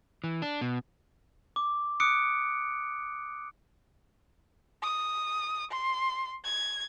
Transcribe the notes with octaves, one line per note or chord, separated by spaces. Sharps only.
E3
D4
B2
D6
D6 D#6 F#6 C#7 D7
D#6
C6
G#6